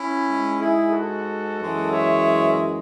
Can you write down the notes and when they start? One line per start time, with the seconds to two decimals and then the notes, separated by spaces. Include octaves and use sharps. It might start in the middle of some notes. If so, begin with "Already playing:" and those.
Already playing: C#4 E4
0.25 G#2 G#3
0.59 E4 G#4
0.91 F#4 A4
1.57 F#2 E3 G#3
1.90 C#5 E5